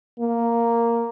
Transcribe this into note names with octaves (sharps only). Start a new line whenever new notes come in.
A#3